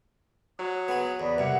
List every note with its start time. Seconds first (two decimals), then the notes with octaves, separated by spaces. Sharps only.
0.59 F#3 D#6
0.88 B3 G#4
1.20 E2 B4 D5
1.38 C2 G2 E5 F#5